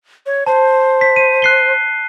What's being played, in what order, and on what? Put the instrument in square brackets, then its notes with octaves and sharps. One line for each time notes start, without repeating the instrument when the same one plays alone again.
[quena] C#5
[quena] C5 [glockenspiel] A5
[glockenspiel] B6
D#7
F#6 C7 G7